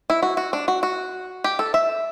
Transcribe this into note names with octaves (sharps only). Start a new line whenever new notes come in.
E4
F#4
F#4
D4
F#4
F#4
G4
A4
E5